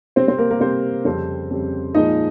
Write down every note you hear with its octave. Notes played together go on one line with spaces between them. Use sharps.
C3 G3 C4 C5
C4 C5
A#3 A#4
A#3 A#4
C3 G3 C4 C5
F2 C#3 G3 C4 C5
F2 C#3 G3
A#2 F3 G#3 D#4 D#5